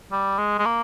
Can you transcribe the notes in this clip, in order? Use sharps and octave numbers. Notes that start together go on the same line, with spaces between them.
G3
G#3
G#3
A#3